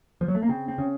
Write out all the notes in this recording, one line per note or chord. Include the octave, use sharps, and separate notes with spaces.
F3
F#3
A3
A#3
C#3 C4
C4
C#3